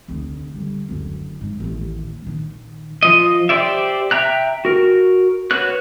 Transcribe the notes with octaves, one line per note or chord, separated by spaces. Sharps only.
F1 D2
D3 G3
F#1 D2
G#2
A1 D#2
A#1 D#3
F3 D#5
G4 C5 D5 E5
E5 G5 A#5 F#6
F#4 A#4
F#4 B4 C#5 F#6